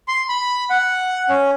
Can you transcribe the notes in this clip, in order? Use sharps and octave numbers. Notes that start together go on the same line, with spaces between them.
C6
B5
F#5
C#4